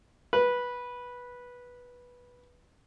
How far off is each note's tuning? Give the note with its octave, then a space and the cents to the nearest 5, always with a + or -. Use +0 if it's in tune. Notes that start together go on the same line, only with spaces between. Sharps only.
B4 -10